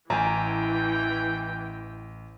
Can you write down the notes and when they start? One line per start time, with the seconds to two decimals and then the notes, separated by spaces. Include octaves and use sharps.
0.10 A1 E3 G5 G#5 A#5